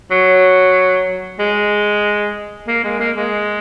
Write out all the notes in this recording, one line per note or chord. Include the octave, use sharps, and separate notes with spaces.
F#3
G#3
A#3
G#3
A#3
G#3